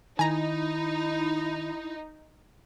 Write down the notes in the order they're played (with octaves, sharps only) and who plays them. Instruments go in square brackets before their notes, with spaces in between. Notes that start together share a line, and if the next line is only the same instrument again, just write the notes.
[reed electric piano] D#3 [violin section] D#4 [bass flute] E4 [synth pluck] G#5 A#5